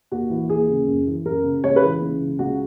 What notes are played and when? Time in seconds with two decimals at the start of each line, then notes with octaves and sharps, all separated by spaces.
0.12 D#2 F#4
0.30 E3
0.49 D#2 G#4
0.69 C#3
0.87 F#2
1.06 E3
1.25 F#2 A#4
1.44 C#3
1.64 C#2 C#5
1.76 B4
1.82 E3
2.01 C#2
2.20 C#3
2.39 C#2 F#4